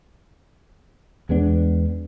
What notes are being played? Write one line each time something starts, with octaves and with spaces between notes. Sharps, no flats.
E2 G#3 B3 D4